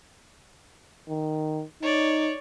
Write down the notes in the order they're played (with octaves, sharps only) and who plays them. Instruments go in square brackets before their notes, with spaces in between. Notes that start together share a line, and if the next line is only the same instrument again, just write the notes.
[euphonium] D#3
[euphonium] D#4 [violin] C#5 D5